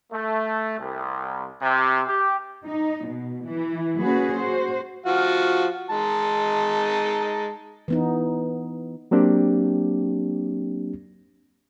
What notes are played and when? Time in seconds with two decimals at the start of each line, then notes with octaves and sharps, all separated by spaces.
0.12 A3
0.78 C2
1.61 C3
2.06 G4
2.66 D#4
3.07 B2
3.46 E3
4.00 A#3 C#4 F#4 G#4 B4
4.37 F#4 C5
5.06 F3 F#4 F5
5.90 G#3 D#4 A5
7.88 E3 B3 D#4
9.11 F#3 A#3 C4 D4 G4